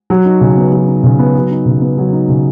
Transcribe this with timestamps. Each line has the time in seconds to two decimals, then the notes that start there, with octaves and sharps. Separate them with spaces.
0.10 F#3
0.25 D#4
0.41 C#3
0.57 B3
0.72 F#3
0.88 D#4
1.04 C#3
1.19 B3
1.35 F#3
1.51 D#4
1.66 C#3
1.81 B3
1.98 F#3
2.13 D#4
2.29 C#3